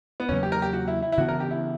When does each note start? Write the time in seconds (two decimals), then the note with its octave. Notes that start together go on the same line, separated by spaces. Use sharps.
0.20 B3
0.29 E2 C#3 F#3 A#3 C#4
0.43 G4
0.52 A#4
0.62 G4
0.73 F#4
0.88 E4
1.02 E4
1.12 E4
1.17 C#3 E3 B3 D4 F#4
1.29 A#4
1.40 G4
1.51 E4